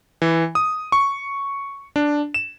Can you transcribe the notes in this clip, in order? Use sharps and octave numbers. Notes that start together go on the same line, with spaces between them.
E3
D#6
C#6
D4
E7